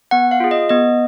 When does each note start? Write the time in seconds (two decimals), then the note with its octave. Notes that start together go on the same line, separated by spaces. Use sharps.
0.11 B3 F#5
0.31 F5
0.40 F4 G#4
0.51 D#5
0.69 B3 D#5